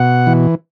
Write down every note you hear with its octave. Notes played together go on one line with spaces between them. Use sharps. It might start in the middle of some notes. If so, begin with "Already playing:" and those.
Already playing: B2 F#5
E3